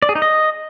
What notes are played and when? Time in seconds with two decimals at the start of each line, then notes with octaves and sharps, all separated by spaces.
0.02 D5
0.09 G#4
0.15 D#4
0.22 D#5